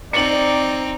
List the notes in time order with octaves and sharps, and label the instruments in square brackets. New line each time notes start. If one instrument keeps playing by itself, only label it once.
[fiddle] C4 D#4 [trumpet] D5 [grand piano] C#7 F#7